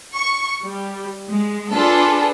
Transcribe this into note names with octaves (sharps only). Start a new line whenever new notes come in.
C#6
G3
G#3
D4 F4 G#4 A4 B4